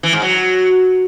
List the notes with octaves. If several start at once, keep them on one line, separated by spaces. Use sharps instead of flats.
E3
G#2
F#3